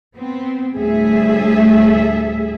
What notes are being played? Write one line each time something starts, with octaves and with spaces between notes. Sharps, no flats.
B3 C4
D2 A2 G3 G#4 A4 E5